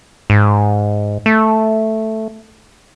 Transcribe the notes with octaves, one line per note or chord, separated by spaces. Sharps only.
G#2
A3